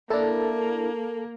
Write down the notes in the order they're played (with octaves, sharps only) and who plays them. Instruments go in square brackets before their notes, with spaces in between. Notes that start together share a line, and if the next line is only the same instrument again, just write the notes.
[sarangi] A#3 [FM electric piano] D4 E4 [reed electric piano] A4 A5 [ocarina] A#4